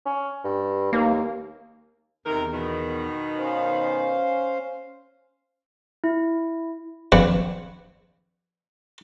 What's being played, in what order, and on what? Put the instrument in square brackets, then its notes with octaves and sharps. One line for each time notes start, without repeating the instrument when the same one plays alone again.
[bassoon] C#4
G2
[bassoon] D#2 [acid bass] A#3
[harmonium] E2 [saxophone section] C3 D#3 A#4
[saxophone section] B2 D#3
[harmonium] C#4 C5 F5
[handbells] E4
[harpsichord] A#1 C4 D4 B4 C#6